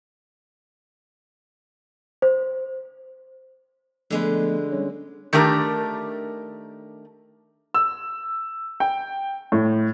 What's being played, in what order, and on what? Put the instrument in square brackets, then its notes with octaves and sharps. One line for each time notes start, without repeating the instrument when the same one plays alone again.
[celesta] C5
[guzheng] D3 G#3 B4 [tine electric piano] F3 A3 B3
[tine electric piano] G3 C#4 C#5
[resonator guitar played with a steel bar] D#3 A3 D4 G4 A#4
[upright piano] E6
G5
A2